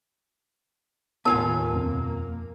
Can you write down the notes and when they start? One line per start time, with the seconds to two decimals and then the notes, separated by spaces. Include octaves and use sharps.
1.25 D#2 A2 B3 F4 A#4 G#5 A5
1.73 F2 B2 A#3 C4